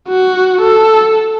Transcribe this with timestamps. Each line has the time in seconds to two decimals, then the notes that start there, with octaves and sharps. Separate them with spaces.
0.08 F#4
0.62 A4